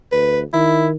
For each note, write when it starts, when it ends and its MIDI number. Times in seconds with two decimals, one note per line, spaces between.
0.12 0.44 38
0.12 0.39 71
0.53 0.97 51
0.53 0.88 64